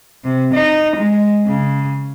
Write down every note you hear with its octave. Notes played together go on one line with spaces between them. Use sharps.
C3
D#4
G#3
C#3